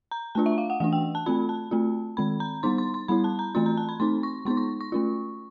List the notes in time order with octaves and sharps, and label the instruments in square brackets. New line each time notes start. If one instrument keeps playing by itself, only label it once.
[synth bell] A#5
A3 D4 F4 A5
E5
F5
F#5
E3 A3 D4 F#5
G5
A5
A3 C4 F4 B5
A5
A3 C4 F4
D#3 G#3 C4 B5
A#5
G3 B3 D#4 C6
C6
C6
G3 B3 E4 B5
A5
A#5
E3 A3 C4 F4 C6
A#5
A5
B5
A3 C4 D#4 C6
C#6
G#3 B3 D#4 C6
C#6
C#6
A3 C#4 F4